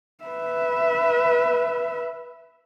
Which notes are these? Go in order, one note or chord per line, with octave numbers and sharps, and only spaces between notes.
B4 E5